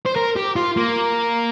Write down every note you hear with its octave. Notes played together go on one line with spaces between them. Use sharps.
C5
A#4
G4
F4
A#3